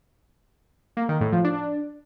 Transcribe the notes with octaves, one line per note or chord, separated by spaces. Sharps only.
A#3
D#3
A2
F3
D4